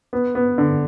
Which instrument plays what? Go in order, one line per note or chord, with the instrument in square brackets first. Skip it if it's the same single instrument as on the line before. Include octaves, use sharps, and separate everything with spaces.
[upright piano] B3
B3
D3